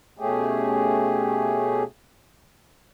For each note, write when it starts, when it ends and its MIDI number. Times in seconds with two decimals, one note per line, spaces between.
0.19 1.83 47
0.19 1.83 57
0.19 1.83 61
0.19 1.83 67
0.19 1.83 68